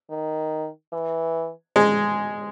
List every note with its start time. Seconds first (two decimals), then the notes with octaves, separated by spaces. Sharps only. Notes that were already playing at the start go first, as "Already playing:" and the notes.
0.10 D#3
0.93 E3
1.76 G#3